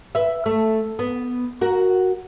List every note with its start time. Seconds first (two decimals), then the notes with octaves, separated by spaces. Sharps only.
0.15 B4 E5
0.46 A3
0.99 B3
1.61 F#4 A#4